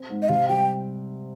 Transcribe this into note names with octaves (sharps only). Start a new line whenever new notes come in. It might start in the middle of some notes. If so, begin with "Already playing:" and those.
Already playing: C4
G#2
D#5
C3 F5
G3 G5